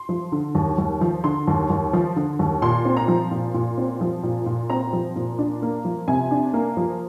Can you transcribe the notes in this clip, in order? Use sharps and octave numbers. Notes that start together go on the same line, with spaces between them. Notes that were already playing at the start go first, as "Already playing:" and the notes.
Already playing: C6
F3
D3
D#2
D#2
F3
D3 C6
D#2
D#2
F3
D3
D#2
A#2 C6
C4
A#5
F3
A#2
A#2
C4
F3
A#2
A#2
C4 A#5
F3
A#2
D4
A#3
F3
C3 G#5
D4
A#3
F3